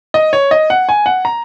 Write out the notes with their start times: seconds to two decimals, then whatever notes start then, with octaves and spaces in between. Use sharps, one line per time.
0.14 D#5
0.33 C#5
0.51 D#5
0.70 F#5
0.89 G#5
1.06 F#5
1.25 A#5